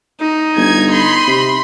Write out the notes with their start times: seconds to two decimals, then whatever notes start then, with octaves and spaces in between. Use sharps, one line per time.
0.21 D#4
0.56 G1 G#6
0.90 B5 C6
1.28 C3